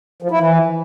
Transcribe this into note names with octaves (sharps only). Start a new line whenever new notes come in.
F3
E4
E3